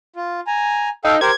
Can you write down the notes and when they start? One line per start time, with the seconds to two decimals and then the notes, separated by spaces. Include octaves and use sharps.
0.16 F4
0.47 G#5 A#5
1.05 D#4 A4 F5 G5
1.21 G4 A#4 C5 G#6